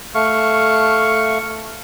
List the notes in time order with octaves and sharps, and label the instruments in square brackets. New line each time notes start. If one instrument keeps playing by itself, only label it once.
[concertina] A3 F5 C#6